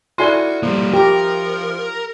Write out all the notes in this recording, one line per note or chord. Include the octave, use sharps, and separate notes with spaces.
E4 F#4 A4 D5 G#5 C6
F3 G3 A#3
G4 A#4